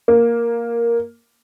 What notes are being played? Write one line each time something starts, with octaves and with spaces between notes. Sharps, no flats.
A#3